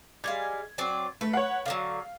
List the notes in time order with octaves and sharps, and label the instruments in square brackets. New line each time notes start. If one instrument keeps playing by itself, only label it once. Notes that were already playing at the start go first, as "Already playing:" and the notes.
[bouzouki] G3 G#3 F5 [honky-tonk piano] G#6
[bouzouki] F#3 C4 D5
[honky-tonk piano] A3 [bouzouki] B4
[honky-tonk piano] C#5 F#5
[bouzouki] D3 F3 F#3 [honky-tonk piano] F5